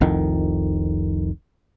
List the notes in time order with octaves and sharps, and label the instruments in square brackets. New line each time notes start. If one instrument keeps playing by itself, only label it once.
[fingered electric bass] F1 C2 F2 D#3